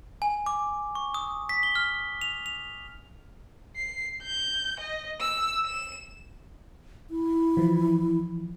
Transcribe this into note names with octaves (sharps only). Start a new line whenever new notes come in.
G#5
D6
C#6
D#6
B6
G7
F6
F7
F7
C7
G6
D#5
E6
E7
E4
E3 F3